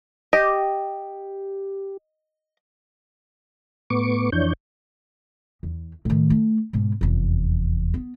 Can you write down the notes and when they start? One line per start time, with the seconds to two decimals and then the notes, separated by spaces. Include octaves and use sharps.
0.33 G4 D#5
3.90 A2 B3 C#6 D6
4.32 F2 E3 D4 C#5 G6
5.63 E2
6.05 A2 D#3
6.30 A3
6.73 G#2 B2
7.01 F1 E2
7.94 B3